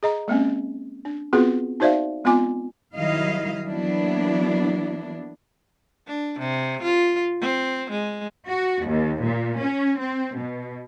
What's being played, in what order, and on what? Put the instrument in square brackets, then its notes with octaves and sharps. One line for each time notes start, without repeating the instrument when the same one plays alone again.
[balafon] G#4 D#5 A#5
G#3 A#3 C4 C#4
D4
B3 C4 F4 F#4 G#4 B4
D#4 F#4 C5 D5 E5 F5
G#3 B3 C4 F4 G#5 D6
[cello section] D#3 F#3 G3 E4 D#5 F5
E3 F#3 A#3 B3 D4 E4
[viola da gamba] D4
C3
F4
C4
G#3
[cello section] F#4
D#2
A#2
C#4
C4
B2